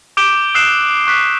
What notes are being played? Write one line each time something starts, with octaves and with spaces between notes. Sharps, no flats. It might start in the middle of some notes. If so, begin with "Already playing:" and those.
D6 G6 D7 E7 G7
D#6 E6 F#6 C7 D7 E7
C#6 F#6 B6